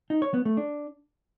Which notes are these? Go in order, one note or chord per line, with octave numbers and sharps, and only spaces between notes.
D#4
C#5
B3
A3
D4